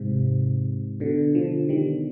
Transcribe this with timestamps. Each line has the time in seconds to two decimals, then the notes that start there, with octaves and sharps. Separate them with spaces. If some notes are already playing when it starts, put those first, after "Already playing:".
Already playing: G#2 C3
1.00 B2 D3
1.35 D3 F3
1.69 D#3 G3